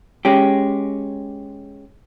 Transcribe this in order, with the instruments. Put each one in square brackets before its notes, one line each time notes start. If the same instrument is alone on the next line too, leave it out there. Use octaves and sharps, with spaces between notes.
[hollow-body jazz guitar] G#3 C#4 G4